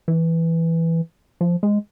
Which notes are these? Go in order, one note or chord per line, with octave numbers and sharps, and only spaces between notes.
E3
F3
G#3